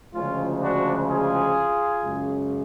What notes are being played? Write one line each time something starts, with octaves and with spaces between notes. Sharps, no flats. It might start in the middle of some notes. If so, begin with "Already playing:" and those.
D2 C#3 F3 G#3 C#4 F4
D4 F#4
F4 G#4
F#2 C#3 G#3